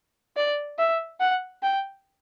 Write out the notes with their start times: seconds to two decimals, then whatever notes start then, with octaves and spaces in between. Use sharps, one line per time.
0.37 D5
0.79 E5
1.20 F#5
1.62 G5